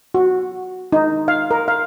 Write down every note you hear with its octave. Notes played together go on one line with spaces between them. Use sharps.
F#4
D#4
F5
A#4
F5